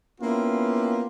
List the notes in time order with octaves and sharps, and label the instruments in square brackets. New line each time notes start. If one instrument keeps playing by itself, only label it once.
[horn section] A#3 B3 C#4 E4 F4 G4